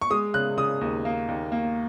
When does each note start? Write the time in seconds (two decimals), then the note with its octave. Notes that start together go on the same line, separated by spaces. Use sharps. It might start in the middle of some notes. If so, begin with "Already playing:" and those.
0.02 C#6
0.11 G#3 D#6
0.34 C#3 F#6
0.57 C#3 D#6
0.81 D#2
1.05 A#3
1.28 D#2
1.52 A#3